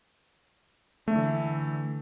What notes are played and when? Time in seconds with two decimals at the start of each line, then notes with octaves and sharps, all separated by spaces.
1.08 D3 E3 A3